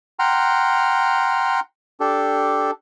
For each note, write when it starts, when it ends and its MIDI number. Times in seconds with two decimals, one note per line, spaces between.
0.19 1.60 78
0.19 1.60 79
0.19 1.60 82
0.19 1.60 84
0.19 1.60 89
2.00 2.71 62
2.00 2.71 67
2.00 2.71 69